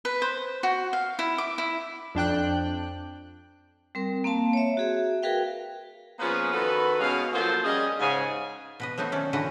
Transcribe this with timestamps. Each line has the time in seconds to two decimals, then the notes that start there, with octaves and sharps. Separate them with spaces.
0.05 B4
0.22 C5
0.63 F#4
0.93 F5
1.19 E4
1.38 D6
1.58 E4
2.15 F2 D4 G5 F#6
3.95 G3 C4 A#4
4.24 A#3 C4 F5 A5
4.53 C#5 E5
4.77 F#4 G#4 E5
5.23 F#4 G#4 A#4 B4 F5 G5
6.19 F3 A#3 B3 C#4 G#4 B4
6.54 D#3 F#4 A4 B4
7.00 B2 G#3 C#4 F5
7.33 F3 F#3 A#3 A4 C5
7.65 G3 C#4 G#4 D#5
7.99 G#2 C#3 G#5
8.80 B2 B4 D#5
8.98 F#3 A3 B3 C4 D#4
9.12 D#3 C#4 D5
9.33 D3 E3 F#4 B4 D#5